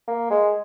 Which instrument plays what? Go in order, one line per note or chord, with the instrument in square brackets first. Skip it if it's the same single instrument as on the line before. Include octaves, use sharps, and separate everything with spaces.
[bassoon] A#3
G#3